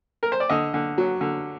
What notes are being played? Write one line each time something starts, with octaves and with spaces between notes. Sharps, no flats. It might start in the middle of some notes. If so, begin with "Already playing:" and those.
A#4
C5
D5
D3 D#5
D3
F#3
D3